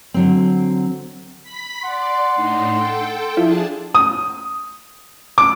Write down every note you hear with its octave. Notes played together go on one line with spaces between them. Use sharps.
D3 F#3 C4
B5 B6
D5 F#5 C6
A2 D4 D#4
A4 G5
F3 D4 E4 F4 G#4 A5
D#6
D6